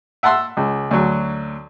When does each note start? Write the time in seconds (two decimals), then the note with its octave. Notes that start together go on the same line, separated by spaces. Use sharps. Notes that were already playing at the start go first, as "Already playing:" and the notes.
0.23 E5 F#5 A5 C6 E6
0.57 C#2
0.91 D2 F#3